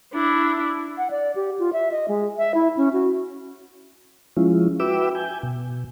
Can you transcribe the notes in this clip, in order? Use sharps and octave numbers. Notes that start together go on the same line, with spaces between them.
D4 E4
F#5
D5
G4
F4
E5
D#5
G#3
E5
E4
C#4
F#4
F3 G#3 C#4 E4 F4
F#4 B4 E5 G5 D6 E6
G#5 G6
B2